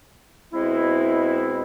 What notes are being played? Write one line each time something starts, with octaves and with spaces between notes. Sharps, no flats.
B2 G#3 C4 E4